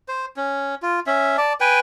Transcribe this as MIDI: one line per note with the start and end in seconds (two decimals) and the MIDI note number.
0.08 0.26 72
0.37 0.75 61
0.82 1.00 65
1.07 1.37 61
1.07 1.37 76
1.38 1.53 74
1.38 1.53 81
1.60 1.80 71
1.60 1.80 79
1.60 1.80 80